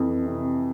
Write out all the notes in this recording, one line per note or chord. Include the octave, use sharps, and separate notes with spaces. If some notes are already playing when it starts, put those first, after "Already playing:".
Already playing: F2 E3
C3